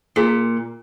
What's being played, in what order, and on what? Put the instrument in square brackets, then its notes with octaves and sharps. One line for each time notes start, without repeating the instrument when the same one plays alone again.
[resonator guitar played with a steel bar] A#2 [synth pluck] G#4 B6